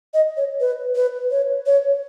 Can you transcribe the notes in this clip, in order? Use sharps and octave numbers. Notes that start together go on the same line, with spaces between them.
D#5
C#5
B4
B4
C#5
C#5